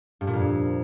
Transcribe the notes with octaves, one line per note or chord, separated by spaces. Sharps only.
G2
A#2
F2